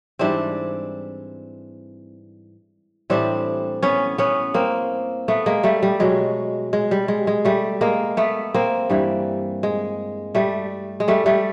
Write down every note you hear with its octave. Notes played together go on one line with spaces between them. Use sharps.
G#2 E3 G3 C4 D4
A2 E3 G3 C4 D4
B3 C#4
B3 C#4
A#3 C4
A3 B3
G#3 A#3
G3 A3
G3
B2 F#3 G#3
G#3
G3
G#3
G#3
G3 A3
G#3 A#3
A3 B3
A#3 C4
G2 E3 G3
G#3
G3 A3
G#3
G3 A3
G3 A3